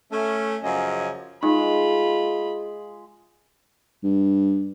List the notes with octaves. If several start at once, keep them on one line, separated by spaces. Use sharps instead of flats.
A3 C#4
F#2 C#3 F3 D#5 G#5
G#3 D#4 F4 B5
G2